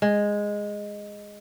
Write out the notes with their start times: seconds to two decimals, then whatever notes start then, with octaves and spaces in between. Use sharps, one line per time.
0.02 G#3